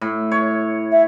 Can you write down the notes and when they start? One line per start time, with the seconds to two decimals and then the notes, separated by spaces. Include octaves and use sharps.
0.01 A2
0.32 C#5
0.91 E5